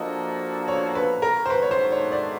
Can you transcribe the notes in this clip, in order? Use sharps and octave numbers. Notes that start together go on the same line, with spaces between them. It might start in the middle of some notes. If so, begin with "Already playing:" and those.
Already playing: F3 A#3 D4 F#4 A4 D#5
C#5
B4
A#4
C5
G#2 D#3 F#3 A3 D4 B4
C#5
C5
C#5
D5